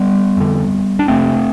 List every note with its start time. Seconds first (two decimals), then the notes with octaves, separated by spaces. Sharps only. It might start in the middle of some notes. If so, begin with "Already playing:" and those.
Already playing: G3 B3
0.37 F2 D3
0.99 D4
1.08 F2 C3 A3 C4